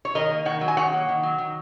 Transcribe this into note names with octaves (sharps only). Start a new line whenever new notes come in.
C#5
D#3 A#4 D#5
A#3
D#3 C#5 F#5
F#3
G#5
D#3 C#5 F#5
A#3
D#3
F#3
D#3